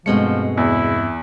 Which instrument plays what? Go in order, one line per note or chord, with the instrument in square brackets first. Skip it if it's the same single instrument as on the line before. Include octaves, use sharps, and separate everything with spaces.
[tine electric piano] G2 C4 C#7 [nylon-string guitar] B2 G#3 A3 [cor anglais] F3
[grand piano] E2 [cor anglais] E4